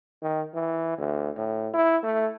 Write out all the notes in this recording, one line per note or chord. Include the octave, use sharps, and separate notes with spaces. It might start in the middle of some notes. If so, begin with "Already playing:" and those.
D#3
E3
D2
A2
E4
A3